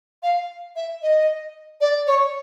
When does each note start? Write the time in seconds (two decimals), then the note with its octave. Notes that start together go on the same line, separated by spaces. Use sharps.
0.23 F5
0.76 E5
1.02 D#5
1.81 D5
2.07 C#5